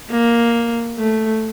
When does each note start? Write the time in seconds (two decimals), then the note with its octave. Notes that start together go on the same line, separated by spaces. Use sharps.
0.10 A#3
0.99 A3